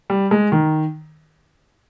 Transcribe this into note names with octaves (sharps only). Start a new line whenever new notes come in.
G3
G#3
D#3